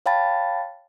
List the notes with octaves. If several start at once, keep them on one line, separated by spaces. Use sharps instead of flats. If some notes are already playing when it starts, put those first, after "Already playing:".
C#5 F5 G5 A5 B5 A6